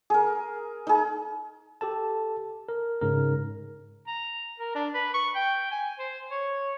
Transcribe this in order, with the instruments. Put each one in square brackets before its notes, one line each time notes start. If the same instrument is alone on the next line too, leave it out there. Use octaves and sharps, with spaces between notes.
[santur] G#4 A#4
D#4 G#4
[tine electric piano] G4 A4 A5
A#4
G#2 C#3 A#4
[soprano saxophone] A#5
A#4
D4
B4
C#6
G5
G#5
C5
C#5